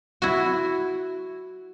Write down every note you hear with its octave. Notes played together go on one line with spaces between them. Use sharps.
E4 F#4